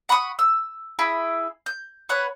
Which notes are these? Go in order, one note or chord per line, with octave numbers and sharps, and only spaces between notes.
F#5 B5 C#6 D#6
E6
E4 G#4 B5
G6
B4 C#5 F#5 B5